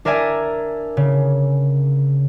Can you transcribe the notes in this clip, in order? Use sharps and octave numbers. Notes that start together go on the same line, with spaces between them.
D4 A#4 D5 E5 G#5 A#5
C#3